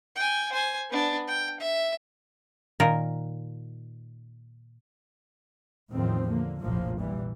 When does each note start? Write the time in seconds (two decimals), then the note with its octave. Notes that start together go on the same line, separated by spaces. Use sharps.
0.16 G5 G#5
0.52 C5 G#5
0.90 B3 D4
1.27 G5
1.60 E5
2.80 A#2 D#3 A#4
5.92 E2 A2 D#3 F3 C4
6.30 D3 A#3
6.62 F1 A#1 A2 F3 A#3
6.99 A#2 E3 G3